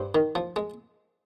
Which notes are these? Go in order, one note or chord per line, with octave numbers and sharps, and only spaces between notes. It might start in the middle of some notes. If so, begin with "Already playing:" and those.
Already playing: G2 C5
D#3
F3
G#3